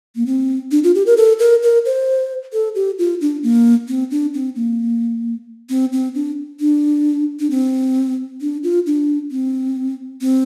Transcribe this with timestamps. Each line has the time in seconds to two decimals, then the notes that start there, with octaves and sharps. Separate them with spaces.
0.16 A#3
0.26 C4
0.71 D4
0.84 F4
0.95 G4
1.06 A#4
1.17 A4
1.39 A#4
1.63 A#4
1.86 C5
2.53 A4
2.75 G4
2.99 F4
3.21 D4
3.43 A#3
3.88 C4
4.11 D4
4.34 C4
4.56 A#3
5.70 C4
5.93 C4
6.15 D4
6.60 D4
7.40 D4
7.51 C4
8.41 D4
8.64 F4
8.86 D4
9.31 C4
10.21 C4